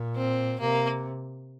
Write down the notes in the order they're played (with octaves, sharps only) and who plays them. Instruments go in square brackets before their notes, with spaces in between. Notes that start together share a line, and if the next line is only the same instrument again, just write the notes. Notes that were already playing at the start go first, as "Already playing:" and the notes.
Already playing: [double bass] A#2
[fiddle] C4
[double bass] C3 [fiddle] A#3